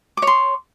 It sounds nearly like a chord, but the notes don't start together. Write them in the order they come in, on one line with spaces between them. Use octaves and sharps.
D6 C#5 C6